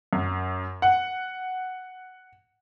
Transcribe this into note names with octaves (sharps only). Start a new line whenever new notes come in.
F#2
F#5